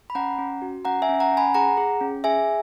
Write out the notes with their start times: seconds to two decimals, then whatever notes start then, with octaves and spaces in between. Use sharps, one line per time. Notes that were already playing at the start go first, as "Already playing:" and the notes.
0.10 B5
0.15 C#4 F#5 A#5
0.39 C#4
0.62 F#4
0.85 C#4 F#5 A#5
1.02 E5 G#5
1.09 C#4
1.20 F#5 A#5
1.32 C#4
1.37 G#5 B5
1.54 G#4 F#5 A#5
1.77 G#4
2.01 C#4
2.24 G#4 E5 G#5